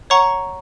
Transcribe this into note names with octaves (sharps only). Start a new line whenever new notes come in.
C#5 F#5 A#5 C#6